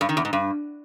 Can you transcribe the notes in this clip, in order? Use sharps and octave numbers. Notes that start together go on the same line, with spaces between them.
G2
D#3
E2
G#2
G2